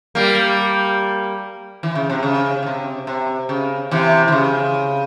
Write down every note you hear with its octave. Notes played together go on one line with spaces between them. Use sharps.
G3 A#3
E3
C#3
C3
C#3
C#3
C3
C3
C#3
C3 E3
E3
C#3